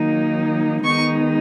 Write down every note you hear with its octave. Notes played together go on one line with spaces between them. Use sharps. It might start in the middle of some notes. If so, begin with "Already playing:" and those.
Already playing: D#3 F#3 A#3 D#4
D#3 G#3 B3 D#4 C#6